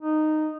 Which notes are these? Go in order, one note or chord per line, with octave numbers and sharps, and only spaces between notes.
D#4